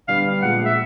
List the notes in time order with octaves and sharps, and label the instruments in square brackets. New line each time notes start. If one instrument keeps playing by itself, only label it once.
[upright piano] D3 G3 B3 [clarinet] F5
[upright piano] A#2 F3 G#3 [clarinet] F#5
[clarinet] E5